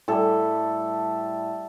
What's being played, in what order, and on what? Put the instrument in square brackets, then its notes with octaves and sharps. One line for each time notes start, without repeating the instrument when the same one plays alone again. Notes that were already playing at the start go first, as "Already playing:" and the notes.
[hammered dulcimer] A2 G3 A4